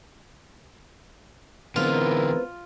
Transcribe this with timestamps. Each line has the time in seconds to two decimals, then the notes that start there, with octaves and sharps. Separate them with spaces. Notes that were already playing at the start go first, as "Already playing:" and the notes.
1.76 D3 E3 G#3 B3 C4 E4 F4 A#4